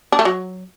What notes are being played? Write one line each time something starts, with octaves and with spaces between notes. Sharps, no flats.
D4
A3
F#3